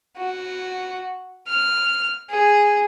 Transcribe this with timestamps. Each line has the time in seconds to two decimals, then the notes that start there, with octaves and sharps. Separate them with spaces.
0.18 F#4
1.48 F6
2.31 G#4